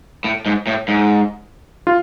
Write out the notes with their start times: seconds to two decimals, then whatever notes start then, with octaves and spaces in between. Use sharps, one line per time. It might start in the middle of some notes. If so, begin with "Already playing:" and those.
0.24 A2
0.46 G#2
0.67 A2
0.88 G#2
1.87 F4